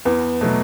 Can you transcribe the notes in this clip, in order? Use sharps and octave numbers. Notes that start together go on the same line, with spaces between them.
E2 B3
B2 F#3 A3